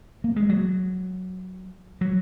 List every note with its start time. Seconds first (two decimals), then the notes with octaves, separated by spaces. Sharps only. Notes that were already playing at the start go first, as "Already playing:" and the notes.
0.24 A#3
0.36 G#3
0.49 F#3
2.01 F#3